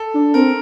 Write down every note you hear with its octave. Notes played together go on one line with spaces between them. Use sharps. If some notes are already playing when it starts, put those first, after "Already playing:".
Already playing: A4
D4
C4 A#4